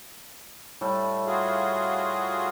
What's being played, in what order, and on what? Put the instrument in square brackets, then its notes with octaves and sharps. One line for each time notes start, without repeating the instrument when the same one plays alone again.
[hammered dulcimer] A2 G3 A3
[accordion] F4 F#4 G#4